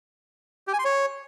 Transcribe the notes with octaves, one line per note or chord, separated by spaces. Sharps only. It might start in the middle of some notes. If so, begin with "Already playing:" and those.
G4
G#5
C6
C#5